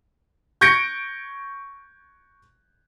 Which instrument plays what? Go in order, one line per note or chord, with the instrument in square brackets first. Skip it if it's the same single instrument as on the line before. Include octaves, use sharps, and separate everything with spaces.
[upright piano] C#6 G6 G#6 A#6 C#7 D7